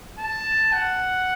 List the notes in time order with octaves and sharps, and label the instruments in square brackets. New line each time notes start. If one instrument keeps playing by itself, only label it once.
[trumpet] A5
F#5